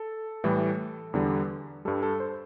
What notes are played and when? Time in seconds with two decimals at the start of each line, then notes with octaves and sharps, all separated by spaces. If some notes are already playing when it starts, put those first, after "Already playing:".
Already playing: A4
0.44 A2 E3 G3
1.13 E2 D3 G3
1.85 G2 G3 A4
2.03 A4
2.20 C5